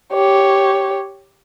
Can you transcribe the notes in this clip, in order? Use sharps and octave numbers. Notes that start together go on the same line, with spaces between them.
G4 C#5